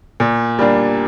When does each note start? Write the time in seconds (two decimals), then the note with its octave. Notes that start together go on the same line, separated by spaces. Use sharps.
0.20 A#2
0.59 G3 A#3 D4